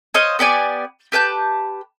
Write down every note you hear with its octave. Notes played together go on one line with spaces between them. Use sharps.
C5 C#5 D#5 F5
B3 G4 D5 G#5
G4 B4 A5 G6